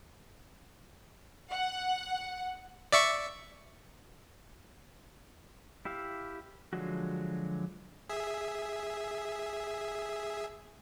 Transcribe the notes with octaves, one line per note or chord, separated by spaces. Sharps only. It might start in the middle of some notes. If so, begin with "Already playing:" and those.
F#5
D5 E5 C#6
E4 G4 E5 F5
D3 F3 F#3 G#3 F#4
G#4 E5